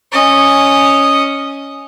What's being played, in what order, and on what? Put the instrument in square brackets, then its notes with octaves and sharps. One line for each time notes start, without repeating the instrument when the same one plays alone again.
[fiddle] C#4 D#5